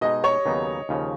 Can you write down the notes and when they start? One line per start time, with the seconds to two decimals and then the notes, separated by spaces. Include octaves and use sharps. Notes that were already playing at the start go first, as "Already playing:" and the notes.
0.01 B2 G#3 D#4 D#5
0.24 C#5
0.46 D#2 C#3 F#3 B3 D#4
0.89 D#2 C#3 F3